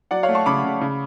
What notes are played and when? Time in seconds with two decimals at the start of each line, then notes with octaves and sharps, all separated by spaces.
0.11 F#3 D5 F#5
0.23 C#5 F5
0.29 A3
0.35 A5 C#6
0.46 C#3 B5 D6
0.64 C#3
0.81 C#3